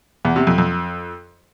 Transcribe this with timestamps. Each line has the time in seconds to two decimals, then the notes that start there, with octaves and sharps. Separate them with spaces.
0.25 E2
0.36 C3
0.47 F2
0.58 F2